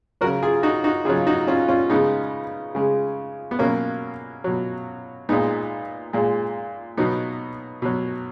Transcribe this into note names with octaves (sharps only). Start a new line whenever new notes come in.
C#3 F#3 F#4 A#4
F4 G#4
D#4 F#4
D#4 F#4
C#3 F#3 F4 G#4
D#4 F#4
C#4 F4
C#4 F4
C#3 G#3 B3 D#4
C#3 G#3
B3
B2 F#3 A#3 C#4
B2 F#3
A#2 G#3 B3 D#4
A#2 G#3
B2 F#3 B3 D#4
B2 F#3